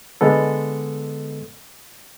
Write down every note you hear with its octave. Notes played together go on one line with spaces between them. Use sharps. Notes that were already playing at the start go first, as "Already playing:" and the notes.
D3 G#3 B3 A4